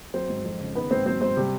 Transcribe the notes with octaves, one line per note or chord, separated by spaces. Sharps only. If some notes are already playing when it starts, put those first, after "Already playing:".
F#3 C4 C5
G#2
F2
C#3
D#3 B3 B4
G#2 C4 C5
F#3 C4 C5
G#2 C4 C5
C3 G3 G4